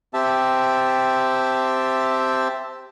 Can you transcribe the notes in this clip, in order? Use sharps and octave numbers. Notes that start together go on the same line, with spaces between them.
C4 G4 E5 A5